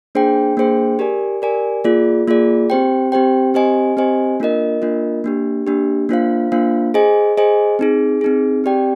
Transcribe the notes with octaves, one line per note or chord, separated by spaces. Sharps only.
A#3 D4 G#4 C5 G5
A#3 D4 G#4 C5 G5
G4 A#4 D5 G#5
G4 A#4 D5 G#5
A#3 F4 G#4 D5
A#3 F4 G#4 D5
C4 G4 C5 G5
C4 G4 C5 G5
C4 G4 C5 D#5 G#5
C4 G4 C5 D#5 G#5
A#3 D4 F4 A#4 D#5
A#3 D4 F4 A#4 D#5
A#3 D4 G4
A#3 D4 G4
A#3 D4 F4 C5 F5
A#3 D4 F4 C5 F5
G#4 C5 D#5 G#5
G#4 C5 D#5 G#5
C4 D#4 G#4
C4 D#4 G#4
C4 G4 D5 G5